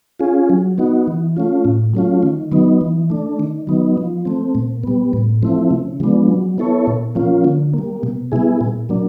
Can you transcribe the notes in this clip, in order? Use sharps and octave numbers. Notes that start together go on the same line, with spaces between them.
C#4 F4 G#4
F#3
B3 D#4 F#4
E3
A3 C#4 F4
A2
F#3 A3 C#4 F4
D#3
F#3 B3 D#4
E3
A3 D4
D#3
F#3 B3 D#4
F3
A3 C4
A#2
G3 B3
A2
F3 A3 C4 E4
C#3
F3 G#3 B3 D4
F#3
B3 E4 A4 C#5
A#2
F3 A#3 C#4 F4
D3
G3 A#3
B2
G3 B3 E4 G#4
A#2
F#3 A#3 D4